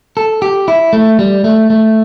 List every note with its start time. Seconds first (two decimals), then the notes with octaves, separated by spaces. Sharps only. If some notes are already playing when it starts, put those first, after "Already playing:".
0.17 A4
0.42 G4
0.68 E4
0.93 A3
1.19 G3
1.44 A3
1.70 A3